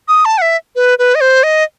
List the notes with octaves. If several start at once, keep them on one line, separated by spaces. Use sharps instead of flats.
D#6
A5
F#5
E5
B4
B4
D#5
C5
D#5